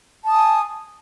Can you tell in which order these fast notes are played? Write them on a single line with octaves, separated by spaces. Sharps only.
A5 D#6 G#5